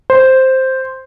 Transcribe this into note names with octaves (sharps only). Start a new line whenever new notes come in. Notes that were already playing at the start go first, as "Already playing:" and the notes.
C5